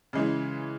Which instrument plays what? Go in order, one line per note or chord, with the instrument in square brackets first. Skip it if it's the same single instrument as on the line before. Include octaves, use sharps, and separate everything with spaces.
[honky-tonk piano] C#3 E3 G#3